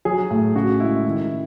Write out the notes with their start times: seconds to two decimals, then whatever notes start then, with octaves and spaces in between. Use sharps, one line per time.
0.05 F#3 G#4
0.30 A2
0.55 C#3 F#4
0.80 G#3 E4
1.05 D#3 E4
1.30 G#3